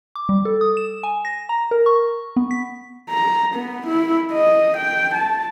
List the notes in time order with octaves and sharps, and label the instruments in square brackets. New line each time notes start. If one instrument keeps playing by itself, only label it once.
[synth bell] D6
G3
A4
D#6
E7
G#5
A#6
A#5
A#4
C#6
B3
B6
[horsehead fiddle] A#5
B3
E4
D#5
G5
A5